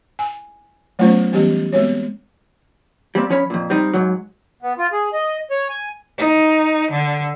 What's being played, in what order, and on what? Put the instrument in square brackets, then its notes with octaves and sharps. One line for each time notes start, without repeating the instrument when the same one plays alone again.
[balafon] G#5
F#3 A3 B3 C#4 F4 C5
E3 G3 B3 C#4 G4 D#5
G#3 B3 C4 F#4 C#5
[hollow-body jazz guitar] G3 A#3 C4
F3 C#4 C#5 B5
F2 A#2
G3 C4 D#4
G#2 F#3
[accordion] B3
F4
G#4
D#5
C#5
G#5
[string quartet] D#4
D3